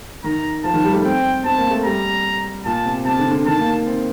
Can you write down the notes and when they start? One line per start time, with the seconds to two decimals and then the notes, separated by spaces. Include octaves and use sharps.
0.24 D#3 A#5
0.64 F3 A5
0.74 D#3
0.84 G3
0.94 A3
1.04 C4 G5
1.45 C4 A5
1.58 A#3
1.71 A3
1.85 G3 A#5
2.65 A#2 A5
2.86 C3
3.05 C3 A5
3.19 D3
3.31 D3
3.46 D#3 A5
3.59 A#3
3.86 C4